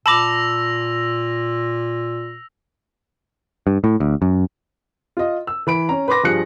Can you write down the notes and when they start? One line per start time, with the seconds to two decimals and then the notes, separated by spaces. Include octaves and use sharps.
0.06 A#2 A5 B5 D6 E6 A#6 F7
3.67 G2
3.84 A2
4.00 D2
4.22 F#2
5.17 F4 D#5
5.47 E6
5.67 E3 B5 D7
5.89 C#4 A#5
6.08 B4 B5 C6 D6 A#6
6.24 G2 F3 G#4 F#6 C#7